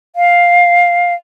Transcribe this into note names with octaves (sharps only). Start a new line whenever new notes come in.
F5